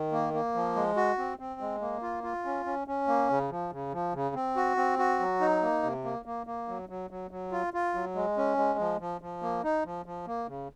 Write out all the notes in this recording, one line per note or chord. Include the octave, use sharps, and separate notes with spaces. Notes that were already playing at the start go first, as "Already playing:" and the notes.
Already playing: D#3
A#3
A#3
F3
G#3
F#4
C4
C4
G#3
A#3
F4
F4
C#4
C#4
C#4
A#3
C#3
F3
C#3
F3
C#3
C4
F#4
C4
F#4
F#3
D#4
A#3
C3
A#3
A#3
A#3
F#3
F#3
F#3
F#3
F4
F4
F#3
G#3
C#4
G#3
F3
F3
F3
A#3
D#4
F3
F3
A#3
C#3